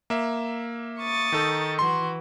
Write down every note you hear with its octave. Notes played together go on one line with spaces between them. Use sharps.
A#3 E5
C#6 D#6 A6
D#3 D#4 A4
E3 F#4 C6